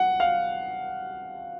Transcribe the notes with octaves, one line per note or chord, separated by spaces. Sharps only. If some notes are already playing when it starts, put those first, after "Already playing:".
Already playing: F#5
F5